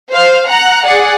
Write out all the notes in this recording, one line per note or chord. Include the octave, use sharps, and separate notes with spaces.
C5 F5
F#5 A#5 F#6
G#4 D5 F#5